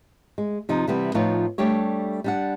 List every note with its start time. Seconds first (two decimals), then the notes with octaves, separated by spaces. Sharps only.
0.38 G#3
0.69 C3 F3 D#4
0.87 C3 E3 G3 B3
1.14 A2 F3 B3 D#4 F4 C#5
1.58 G3 A3 D4 G4 C#5
2.24 G3 D4 F#5